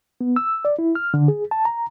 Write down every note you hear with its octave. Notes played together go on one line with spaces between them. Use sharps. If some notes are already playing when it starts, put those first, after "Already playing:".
B3
E6
D5
E4
F6
D3
G#4
A5
A#5